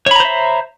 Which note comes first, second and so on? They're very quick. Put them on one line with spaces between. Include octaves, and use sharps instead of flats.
C#5 B5 A#5 C5 E5